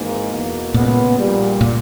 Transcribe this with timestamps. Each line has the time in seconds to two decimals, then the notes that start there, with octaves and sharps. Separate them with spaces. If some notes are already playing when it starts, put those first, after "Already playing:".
Already playing: G#1 G#2 E3 A#3
0.31 E2 B2 A#3
0.74 A#2 C#3 G#3 B3
1.18 A#1 A#2 G3
1.61 A#2